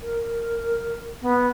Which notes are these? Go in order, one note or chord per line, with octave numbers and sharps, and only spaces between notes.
A#4
B3